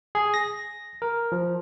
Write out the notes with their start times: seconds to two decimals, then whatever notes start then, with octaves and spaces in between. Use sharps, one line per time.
0.15 G#4
0.34 A#6
1.02 A#4
1.32 F3